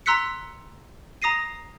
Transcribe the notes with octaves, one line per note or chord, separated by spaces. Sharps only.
A#5 C6 E6 F#6 B6 C#7
A#5 D#6 A#6 C7 D#7